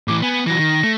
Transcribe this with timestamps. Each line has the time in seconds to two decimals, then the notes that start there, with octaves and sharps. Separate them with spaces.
0.08 A2 E3 D6
0.22 B3 G#5
0.47 E3 F#3 A#6
0.59 D#3
0.84 A3